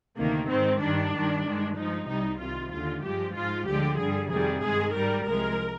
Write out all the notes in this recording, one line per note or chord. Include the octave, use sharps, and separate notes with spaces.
D2 C3 D#3 A#3
G#2 D#3 G#3 C4
G2 D#3 G3 D4
G2 D#3 G3
G2 D#3 G#3
G2 F3 G#3 D#4
C2 C3 G3 D#4
C2 C3 D#3 G3 F4
D#2 D3 G#3 F4
G2 F3 G#3 G4
G#2 F3 G#3 F4
D2 D3 F3 G#3 G4
G2 D3 G3 G#4
F2 C3 D#3 G3 G#4
G2 D#3 G#3 G#4
G#2 G3 A#4
C2 C3 F3 G#3 A#4